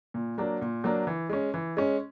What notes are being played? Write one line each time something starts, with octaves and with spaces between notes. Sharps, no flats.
A#2
F#3 A#3 D4
A#2
F#3 A#3 D4
E3
G#3 C#4
E3
G#3 C#4